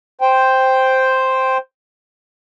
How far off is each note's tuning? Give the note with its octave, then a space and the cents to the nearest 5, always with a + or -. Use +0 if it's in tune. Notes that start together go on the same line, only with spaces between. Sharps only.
C5 +0 G5 +0